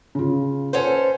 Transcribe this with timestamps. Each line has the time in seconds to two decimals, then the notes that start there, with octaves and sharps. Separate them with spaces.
0.15 C#3 F4
0.73 C#4 A4 B4 C5 F#5 G#5